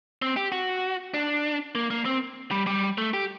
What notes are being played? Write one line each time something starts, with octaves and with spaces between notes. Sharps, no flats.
C4
G4
F#4
D4
A#3
A#3
C4
G3
G3
A3
G4